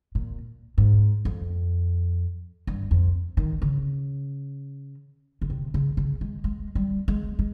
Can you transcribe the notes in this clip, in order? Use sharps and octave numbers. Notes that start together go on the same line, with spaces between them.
A#2
G#2
F2
G2
F2
D#3
C#3
C#3
C3
C#3
C#3
G#3
G#3
G3
G#3
G#3